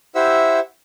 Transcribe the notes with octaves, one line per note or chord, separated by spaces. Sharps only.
E4 G4 C5 E5 F#5 E6